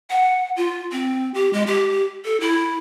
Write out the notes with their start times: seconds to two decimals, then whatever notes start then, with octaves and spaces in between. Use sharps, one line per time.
0.10 F#5
0.57 F4
0.92 C4
1.34 G4
1.53 G#3
1.67 G4
2.25 A4
2.40 E4